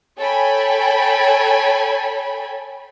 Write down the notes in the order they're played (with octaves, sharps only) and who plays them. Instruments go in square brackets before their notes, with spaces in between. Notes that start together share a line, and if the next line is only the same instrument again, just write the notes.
[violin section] A4 C#5 G5 G#5 B5